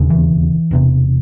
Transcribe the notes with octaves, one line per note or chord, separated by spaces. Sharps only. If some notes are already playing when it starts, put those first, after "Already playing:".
Already playing: E1 D#2 C#3
E3
E1 E2 C3